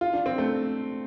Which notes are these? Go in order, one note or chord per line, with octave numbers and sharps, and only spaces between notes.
F4
D4
C4
A3